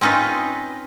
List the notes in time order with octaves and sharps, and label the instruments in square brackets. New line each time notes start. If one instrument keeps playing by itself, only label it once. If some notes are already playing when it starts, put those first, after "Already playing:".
[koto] C4 C#4 D#4 F4 B4